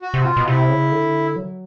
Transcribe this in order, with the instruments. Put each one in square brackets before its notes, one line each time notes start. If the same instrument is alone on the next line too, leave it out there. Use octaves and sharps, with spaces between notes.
[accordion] F#4
[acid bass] C3
[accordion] F4
[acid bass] B2
[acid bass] C3 [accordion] E4
[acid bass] C#3
D3
F#3